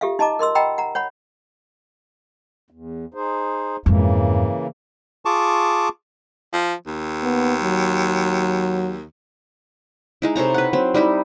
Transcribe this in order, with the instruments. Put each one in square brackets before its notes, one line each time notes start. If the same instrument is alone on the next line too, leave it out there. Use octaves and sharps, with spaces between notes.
[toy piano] F4 G4 A4 E5 F5
D#4 D#5 A5 A#5 D6
A#4 D#5 C6 E6
D#5 F#5 G5 A#5 B5 E6
F#5 A#5
C#5 F#5 B5
[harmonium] E2
D#4 G#4 C5
[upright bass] F2 G#2 [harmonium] C#3 E3 A#3
[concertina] F4 G#4 A5 C#6 D6
[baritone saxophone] F3
D#2
[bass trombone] B3
F#3
[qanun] G#3 D#4 E4
C3 A4 C#5 A#5
B4 F#5
F#3 C4
G3 D#4 E4